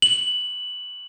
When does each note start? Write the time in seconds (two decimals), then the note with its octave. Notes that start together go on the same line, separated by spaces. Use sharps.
0.02 F#7